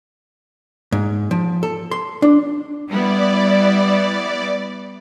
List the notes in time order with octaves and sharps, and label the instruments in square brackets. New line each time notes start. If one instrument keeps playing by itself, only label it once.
[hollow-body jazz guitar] G#2
F3
A4
C6
D4
[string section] G3 B3 E4 [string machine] D5